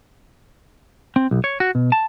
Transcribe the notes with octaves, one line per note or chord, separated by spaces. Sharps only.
C4
B1
C#5
F#4
B2
A5